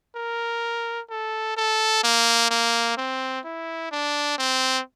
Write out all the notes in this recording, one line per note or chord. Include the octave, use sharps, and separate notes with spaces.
A#4
A4
A4
A#3
A#3
C4
E4
D4
C4